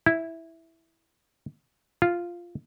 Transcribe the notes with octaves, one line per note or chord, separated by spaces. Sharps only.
E4
F4